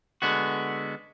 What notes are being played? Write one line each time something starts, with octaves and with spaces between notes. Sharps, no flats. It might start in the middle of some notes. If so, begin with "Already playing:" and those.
D3 G#3 B3 F#4